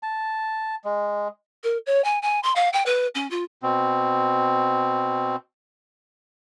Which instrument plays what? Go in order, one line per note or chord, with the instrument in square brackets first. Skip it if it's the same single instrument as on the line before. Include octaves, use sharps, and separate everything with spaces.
[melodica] A5
G#3
[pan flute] A#4
C#5
G#5
G#5
C6
F5
G5
B4
C#4
F4
[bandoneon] B2 C4